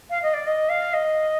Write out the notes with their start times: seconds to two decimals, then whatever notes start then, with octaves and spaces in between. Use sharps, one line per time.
0.10 F5
0.22 D#5
0.33 D5
0.46 D#5
0.69 F5
0.93 D#5